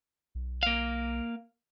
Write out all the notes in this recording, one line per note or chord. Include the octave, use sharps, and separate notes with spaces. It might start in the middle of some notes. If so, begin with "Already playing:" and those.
B1
A#3 F5